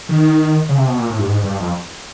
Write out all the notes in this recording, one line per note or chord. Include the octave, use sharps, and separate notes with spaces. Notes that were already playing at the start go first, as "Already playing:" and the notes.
D#3
C#3
C3
B2
A#2
A2
G2
G#2
G2
F2